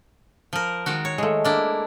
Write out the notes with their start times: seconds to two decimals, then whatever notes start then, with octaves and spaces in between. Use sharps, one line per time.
0.53 F3 A#4
0.86 D#3 G#3 F#4
1.05 C#5
1.18 G#3 A3
1.45 A#3 D4 E4